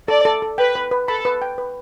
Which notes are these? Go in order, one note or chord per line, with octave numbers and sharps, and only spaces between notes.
A4 D5
A4
A4
B4 G5
B4
B4
A4 B5
B4
G5
B4